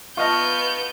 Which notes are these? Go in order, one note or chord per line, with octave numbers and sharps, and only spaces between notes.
B3 F4 D#5 A5 C#6 F6 G6 A#6